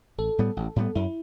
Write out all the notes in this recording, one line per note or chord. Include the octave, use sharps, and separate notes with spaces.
A1 A4
A2 G3 B3
A1
A2 G3 B3
F#2 E4